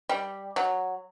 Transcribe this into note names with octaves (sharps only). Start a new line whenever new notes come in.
G3
F#3